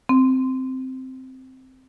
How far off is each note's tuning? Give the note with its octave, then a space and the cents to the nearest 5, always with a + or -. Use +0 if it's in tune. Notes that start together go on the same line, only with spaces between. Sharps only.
C4 -5